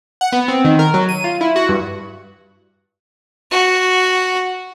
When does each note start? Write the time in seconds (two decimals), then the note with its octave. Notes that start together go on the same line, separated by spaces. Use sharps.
0.21 F#5
0.32 B3
0.48 C4
0.65 D#3
0.79 A#4
0.94 F#3
1.09 D#7
1.24 F4
1.41 E4
1.56 F#4
1.69 G2
3.51 F#4